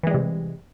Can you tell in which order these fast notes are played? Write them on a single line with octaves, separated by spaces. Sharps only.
E3 G#3 G3 C3